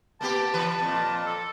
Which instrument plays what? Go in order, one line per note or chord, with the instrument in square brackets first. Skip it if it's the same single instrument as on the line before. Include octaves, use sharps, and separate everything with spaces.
[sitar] A#3 B3 G4 [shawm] A5
[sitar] E3 B4
F2 A#2
[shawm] A4